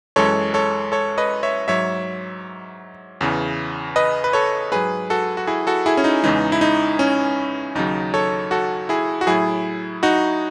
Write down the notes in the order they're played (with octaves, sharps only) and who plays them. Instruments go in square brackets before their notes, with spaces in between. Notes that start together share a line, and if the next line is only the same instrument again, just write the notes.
[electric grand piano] F#2 E3 G#3 A4 C#5
A4 C#5
A4 C#5
B4 D#5
C#5 E5
G#2 F#3 C#5 E5
E2 C#3 E3
B4 D#5
B4
A4 C#5
G#2 F#3 G#4 B4
F#4 A4
F#4
E4 G#4
F#4 A4
E4 G#4
C#4
D#4
E2 C#3 E3 G#3 D#4
E4
D#4
C#4
D#2 C#3 F#3 D#4
A4 C#5
F#4 A4
E4 G#4
F#4
A2 F#3 E4 G#4
D#4 F#4